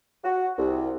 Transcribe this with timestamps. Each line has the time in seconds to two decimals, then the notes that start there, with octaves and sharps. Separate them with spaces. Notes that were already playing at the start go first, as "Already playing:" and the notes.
0.24 F#4
0.57 C2